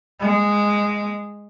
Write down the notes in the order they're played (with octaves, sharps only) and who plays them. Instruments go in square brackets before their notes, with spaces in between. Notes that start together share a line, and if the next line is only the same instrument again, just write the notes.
[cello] G#3